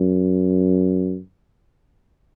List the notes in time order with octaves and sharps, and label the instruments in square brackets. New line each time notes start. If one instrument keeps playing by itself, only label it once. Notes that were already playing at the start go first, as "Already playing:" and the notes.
Already playing: [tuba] F#2